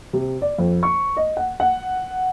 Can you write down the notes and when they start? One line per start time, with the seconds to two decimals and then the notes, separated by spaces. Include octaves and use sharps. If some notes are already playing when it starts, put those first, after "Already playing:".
0.13 C3
0.42 D5
0.58 F2
0.83 C#6
1.17 D#5
1.37 F#5
1.60 F#5